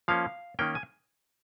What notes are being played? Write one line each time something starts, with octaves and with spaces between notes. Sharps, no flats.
F3 A#3 C#4 F5
D#3 A#3 C#4 G5
G#5